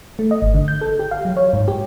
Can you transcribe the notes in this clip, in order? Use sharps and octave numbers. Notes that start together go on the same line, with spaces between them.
A3
D#5
G#1
D3
G6
A4
G4
F5
F#3
C#5
G#2
G4